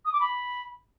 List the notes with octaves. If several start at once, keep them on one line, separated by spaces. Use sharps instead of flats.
D#6
D6
B5